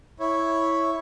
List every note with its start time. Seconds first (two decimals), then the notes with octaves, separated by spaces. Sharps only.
0.20 E4 C#5